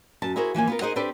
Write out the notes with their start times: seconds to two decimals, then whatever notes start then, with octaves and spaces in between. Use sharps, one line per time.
0.22 F#2 A5
0.36 E4 F#4 G#4 A#4 C5
0.54 E3 F3 A#3 G#5
0.67 B3 F4 A#4
0.81 D#4 G#4 A#4 C5 D#5 F#5
0.96 C4 D4 G4 A4 B4 C5